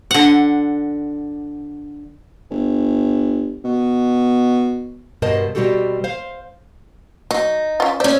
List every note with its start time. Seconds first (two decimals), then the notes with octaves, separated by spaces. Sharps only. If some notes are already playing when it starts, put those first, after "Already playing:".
0.11 D3 F#5
2.50 G1
3.64 B2
5.22 G2 B2 A#4 C5 D#5 A5
5.55 B2 G3 C4 F#4 G4 A4
6.04 C5 F5
7.31 F#3 D#4
7.80 C#4 F4
8.00 C#4 C5 D5 E5